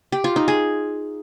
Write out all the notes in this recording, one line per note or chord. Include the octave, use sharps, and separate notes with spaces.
G4
F4
D#4
G#4